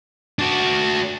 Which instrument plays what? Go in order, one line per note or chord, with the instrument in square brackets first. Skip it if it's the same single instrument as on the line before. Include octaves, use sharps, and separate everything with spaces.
[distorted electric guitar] D4 F#4